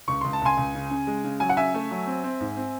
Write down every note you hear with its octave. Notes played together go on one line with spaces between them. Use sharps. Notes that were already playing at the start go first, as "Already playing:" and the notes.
C#2 C#6
C#2 C6
A5
C#2 G#5 C6
C#2
C#3
C#3
G#3
C#3
F#3 G#5
F#5
C#3 E5 G#5
A3
F#3
C4
C4
G#2
C4